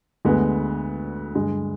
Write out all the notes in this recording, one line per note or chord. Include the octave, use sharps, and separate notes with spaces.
D2 D3 G#3 B3
G2 D3 G#3